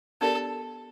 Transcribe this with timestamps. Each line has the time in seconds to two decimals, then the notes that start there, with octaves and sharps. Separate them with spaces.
0.21 B3 D4 G4 A4 A#4 D5